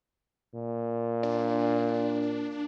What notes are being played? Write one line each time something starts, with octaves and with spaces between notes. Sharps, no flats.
A#2
D4